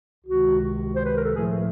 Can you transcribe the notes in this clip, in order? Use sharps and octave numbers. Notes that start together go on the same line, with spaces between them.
C#2 C3 D#3 F#4
C5
B4
A#4
A4
A2 F3 A3 G#4